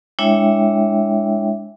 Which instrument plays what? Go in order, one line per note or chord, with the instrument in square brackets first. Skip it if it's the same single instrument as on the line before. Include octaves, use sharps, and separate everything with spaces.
[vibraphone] G#3 D4 E4 C#5 E5 G5